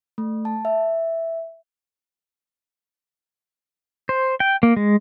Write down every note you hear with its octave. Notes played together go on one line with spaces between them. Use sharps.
A3
A5
E5
C5
G5
A#3
G#3